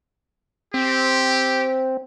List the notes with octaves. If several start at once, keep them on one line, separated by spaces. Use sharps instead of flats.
C4 G4